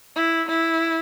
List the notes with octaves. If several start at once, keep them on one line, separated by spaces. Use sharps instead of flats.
E4
E4